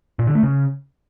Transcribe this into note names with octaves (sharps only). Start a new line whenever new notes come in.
A#2
D3
A3
C#3